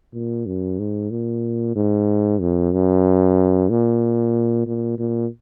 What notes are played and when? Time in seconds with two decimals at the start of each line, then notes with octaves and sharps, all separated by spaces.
0.13 A#2
0.46 F#2
0.79 G#2
1.11 A#2
1.76 G#2
2.41 F2
2.73 F#2
3.70 A#2
4.67 A#2
4.99 A#2